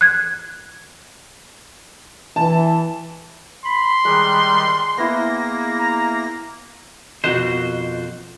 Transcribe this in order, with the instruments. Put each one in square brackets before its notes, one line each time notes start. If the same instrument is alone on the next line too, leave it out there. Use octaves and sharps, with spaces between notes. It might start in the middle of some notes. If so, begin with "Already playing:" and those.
[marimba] F#6 G#6
[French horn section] E3 [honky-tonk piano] A5
[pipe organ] B5 [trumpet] C6
[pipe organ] D#3 G3 F#6 [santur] G#3
[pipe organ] A#3 A#6 [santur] B3 E4
[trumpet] A#5
[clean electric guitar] F2 C5 [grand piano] B2 F#6 E7 [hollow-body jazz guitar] F#4 A#4 D#5